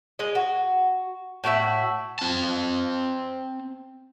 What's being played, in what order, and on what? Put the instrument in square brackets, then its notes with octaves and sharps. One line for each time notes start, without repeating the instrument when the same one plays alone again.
[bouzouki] G#3 D#5
F#4
A2 F#4 G4 E5
[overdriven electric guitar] C4 A5